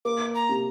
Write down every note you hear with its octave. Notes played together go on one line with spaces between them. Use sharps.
A#3 D6
A#5
C3